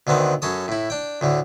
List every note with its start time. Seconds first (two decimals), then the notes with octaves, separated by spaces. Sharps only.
0.07 D2 D3 D#3 B3 C4
0.42 F#2 C#4 A4 D#6
0.68 A2 E4
0.90 D4 G5
1.21 D2 A2 D3